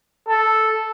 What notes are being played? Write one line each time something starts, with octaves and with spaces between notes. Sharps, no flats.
A4